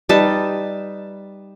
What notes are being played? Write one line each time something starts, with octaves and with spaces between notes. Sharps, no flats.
G3 D#4 B4 A5